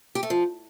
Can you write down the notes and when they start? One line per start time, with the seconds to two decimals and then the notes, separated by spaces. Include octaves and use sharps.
0.15 G4
0.23 A3
0.30 F3